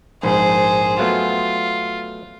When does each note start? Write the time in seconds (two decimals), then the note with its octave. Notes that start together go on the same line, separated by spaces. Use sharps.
0.23 A#1 G#2 G#4 C5
0.99 F#3 A3 B3 F4